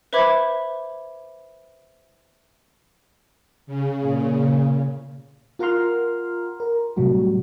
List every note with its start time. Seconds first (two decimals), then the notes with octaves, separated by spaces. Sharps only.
0.13 B4 C5 E5 B5 D6 G#6
3.67 C#3
4.02 A#2
5.59 F4 A#4 F#5 A#5 C6 F6
6.60 A#4
6.96 A2 C3 F#3 G3 A3 F#4